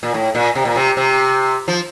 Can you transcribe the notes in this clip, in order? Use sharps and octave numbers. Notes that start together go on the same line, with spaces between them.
A#2
A2
A#2
C3
A#2
C3
C3
F3